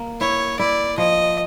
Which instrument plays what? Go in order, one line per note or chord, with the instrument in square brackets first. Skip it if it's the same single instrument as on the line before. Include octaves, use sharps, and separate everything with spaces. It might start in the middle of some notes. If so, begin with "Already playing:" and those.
Already playing: [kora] A#3
[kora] E4 [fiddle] C#5
[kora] E4 [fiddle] D5
[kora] F3 [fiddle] D#5